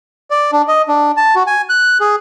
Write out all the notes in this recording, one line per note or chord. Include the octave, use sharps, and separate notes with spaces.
D5
D4
D#5
D4
A5
F#4
G#5
F#6
G#4